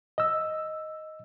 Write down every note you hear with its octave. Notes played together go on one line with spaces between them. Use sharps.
D#5 E6